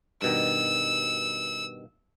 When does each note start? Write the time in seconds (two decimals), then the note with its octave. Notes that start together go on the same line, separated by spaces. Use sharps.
0.22 G2 B2 D#3 E6